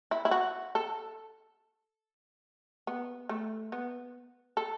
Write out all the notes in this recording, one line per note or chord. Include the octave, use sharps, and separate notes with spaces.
E4
E4
F#4
A4
B3
A3
B3
A4